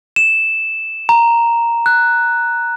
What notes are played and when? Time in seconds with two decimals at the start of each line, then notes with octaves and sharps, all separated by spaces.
0.16 E7
1.09 A#5
1.86 F#6